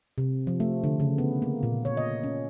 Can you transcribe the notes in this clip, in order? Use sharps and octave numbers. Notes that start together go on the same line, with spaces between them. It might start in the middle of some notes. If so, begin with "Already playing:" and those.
C3
F3
A3
D3
C#3
B3
A#3
A#2
C#5
D#5
C#4